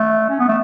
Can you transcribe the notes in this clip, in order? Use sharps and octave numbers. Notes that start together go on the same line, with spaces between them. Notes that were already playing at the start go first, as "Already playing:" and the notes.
Already playing: A3
C#4
B3
A3